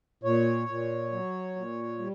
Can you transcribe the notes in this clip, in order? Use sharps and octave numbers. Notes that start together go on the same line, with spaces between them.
A#2 C#5
A#2
F#3
A#2
G3